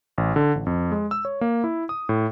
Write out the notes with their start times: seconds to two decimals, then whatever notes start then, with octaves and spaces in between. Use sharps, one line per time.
0.18 A1
0.36 D3
0.55 A1
0.66 F2
0.91 G#3
1.11 E6
1.25 C#5
1.41 A#3
1.64 E4
1.89 D#6
2.09 A2